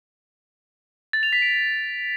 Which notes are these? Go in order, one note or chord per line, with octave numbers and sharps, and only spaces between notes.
A6
F7
B6
D7